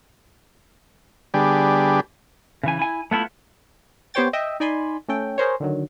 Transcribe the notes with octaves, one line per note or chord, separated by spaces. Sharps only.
D3 G3 B3 D4 G4 G#4
C#3 E3 G#5
E4 G#5
A3 B3 E4 F4
B3 G4 C5 C#5 G5 A6
D#5 E5 G5
D#4 D5 G#5 B5 C6
A3 C#4 A4 G5
G#4 A#4 C5 C#5
D3 D#3 F#3